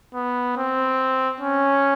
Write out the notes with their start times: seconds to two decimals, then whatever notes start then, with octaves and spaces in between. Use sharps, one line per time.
0.14 B3
0.56 C4
1.40 C#4